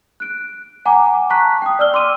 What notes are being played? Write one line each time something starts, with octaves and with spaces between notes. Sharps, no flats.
F#6 D7
F#5 G#5 A#5 D6
A5 A#5 C#6 F#6 B6
G5 D#6
D5 E6 F6 G7
C6 D6 E6 D#7